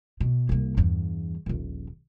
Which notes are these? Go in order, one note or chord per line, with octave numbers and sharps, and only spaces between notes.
B2
C2 A#3
E2 G2
D#1 A#1